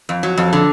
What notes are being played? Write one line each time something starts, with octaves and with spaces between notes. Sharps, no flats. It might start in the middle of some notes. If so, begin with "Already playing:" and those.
F2
F#3
F2
D3